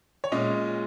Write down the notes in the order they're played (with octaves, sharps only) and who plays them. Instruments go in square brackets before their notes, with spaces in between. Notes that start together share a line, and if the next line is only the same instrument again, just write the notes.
[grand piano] C#5
A#2 G#3 C#4 D#5